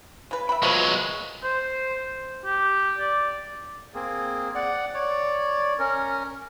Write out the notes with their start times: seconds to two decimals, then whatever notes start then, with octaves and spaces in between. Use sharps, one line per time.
0.31 C#3 B4
0.49 E5 G5 B5
0.62 F3 F#3 G#3 B3 A#4
1.44 C5
2.45 G4
2.98 D5
3.94 A#3 C4 G#4
4.55 D5 F#5
4.94 C#5 D5
5.79 C#4 A#4